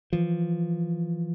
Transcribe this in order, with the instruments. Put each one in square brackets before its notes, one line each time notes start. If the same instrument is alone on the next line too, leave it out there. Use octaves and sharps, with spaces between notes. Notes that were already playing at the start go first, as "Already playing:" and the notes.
[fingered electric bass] E3 F3